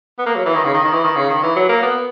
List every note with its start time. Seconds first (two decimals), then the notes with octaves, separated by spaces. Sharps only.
0.18 B3
0.26 A#3
0.35 F#3
0.45 E3
0.55 D#3
0.64 C#3
0.74 D#3
0.84 D#3
0.93 E3
1.04 D#3
1.16 C#3
1.30 D#3
1.43 E3
1.56 F#3
1.69 A#3
1.82 B3